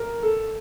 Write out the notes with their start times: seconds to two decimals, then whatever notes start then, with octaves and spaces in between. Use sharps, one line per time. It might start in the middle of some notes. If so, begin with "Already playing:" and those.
Already playing: A#4
0.23 A4